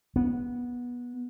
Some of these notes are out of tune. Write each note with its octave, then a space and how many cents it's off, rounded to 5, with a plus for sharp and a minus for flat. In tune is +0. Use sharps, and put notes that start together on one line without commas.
B3 -15